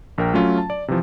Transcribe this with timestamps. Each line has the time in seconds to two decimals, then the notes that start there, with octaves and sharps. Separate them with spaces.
0.18 A#1 A#4 G5
0.34 F#3 A3 C#4 F4
0.58 A5
0.70 D5
0.88 C3 E3 F3